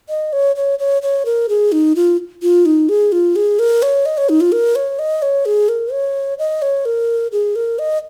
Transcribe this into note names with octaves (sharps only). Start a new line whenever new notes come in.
D#5
C#5
C#5
C#5
C#5
A#4
G#4
D#4
F4
F4
D#4
G#4
F4
G#4
A#4
C#5
D#5
C#5
D#4
F4
A#4
C#5
D#5
C#5
G#4
A#4
C#5
D#5
C#5
A#4
G#4
A#4
D#5